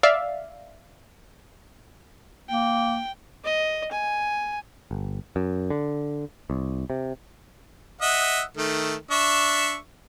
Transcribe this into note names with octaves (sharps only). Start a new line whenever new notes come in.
D5 E5 F5
A#3 G5
D#5
G#5
G1
F#2
D3
C2
C3
D#5 E5 F#5
D#3 A3
D4 E5 C#6